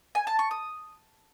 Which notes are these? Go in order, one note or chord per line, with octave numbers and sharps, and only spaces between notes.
G#5
A5
C#6
D#6